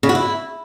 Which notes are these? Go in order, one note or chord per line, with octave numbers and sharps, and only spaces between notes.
C#3
F#4
E4